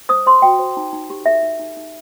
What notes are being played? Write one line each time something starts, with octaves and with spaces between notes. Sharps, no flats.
C5 D#6
C5 C6
F#4 G5
C5
D#4
D#4
G4
A4 E5
D#4
D#4
D#4